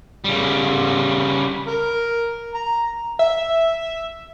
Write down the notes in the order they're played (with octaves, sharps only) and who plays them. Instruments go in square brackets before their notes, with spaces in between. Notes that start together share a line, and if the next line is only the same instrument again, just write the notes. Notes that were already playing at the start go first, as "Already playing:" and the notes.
[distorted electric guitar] C#3 G3
[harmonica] A#4
A#5
[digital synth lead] E5